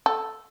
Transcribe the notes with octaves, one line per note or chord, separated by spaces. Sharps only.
A4